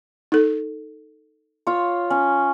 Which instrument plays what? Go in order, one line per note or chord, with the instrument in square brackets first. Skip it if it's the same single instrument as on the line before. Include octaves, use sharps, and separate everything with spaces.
[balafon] D#4 A4
[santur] F4 C#5
C#4